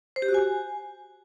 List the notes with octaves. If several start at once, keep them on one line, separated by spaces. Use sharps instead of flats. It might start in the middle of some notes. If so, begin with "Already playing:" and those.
C5
G4
F#4
G#5